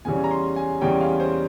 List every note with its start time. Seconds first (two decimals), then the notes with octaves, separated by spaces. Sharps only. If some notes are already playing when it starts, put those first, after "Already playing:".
0.05 E2 C#3 E3 G3 C#4 G#5
0.24 A#5
0.31 C6
0.56 G#5
0.81 E2 C#3 E3 G3 C#4 G5
1.01 F5
1.20 C5